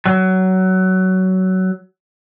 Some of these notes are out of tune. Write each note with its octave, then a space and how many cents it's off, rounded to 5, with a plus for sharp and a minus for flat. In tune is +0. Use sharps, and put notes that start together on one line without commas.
F#3 +20